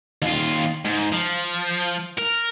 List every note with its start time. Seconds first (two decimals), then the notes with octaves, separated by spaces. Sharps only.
0.22 D#2 F4
0.85 G#2
1.12 F3
2.18 A#4